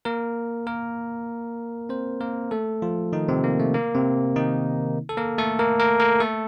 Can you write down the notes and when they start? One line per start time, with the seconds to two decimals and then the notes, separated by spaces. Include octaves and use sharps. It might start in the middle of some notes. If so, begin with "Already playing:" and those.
0.05 A#3 A#4
0.67 A#3 A#4
1.89 C4 C5
2.21 A#3 A#4
2.51 A3 A4
2.82 F3 F4
3.13 D#3 D#4
3.29 C3 C4
3.44 A#3
3.59 A3
3.74 A#3
3.95 C3 C4
4.36 D#3 D#4
5.09 A4
5.17 A#3 A#4
5.38 A3 A4
5.59 A#3 A#4
5.80 A#3 A#4
6.00 A#3 A#4
6.20 A3 A4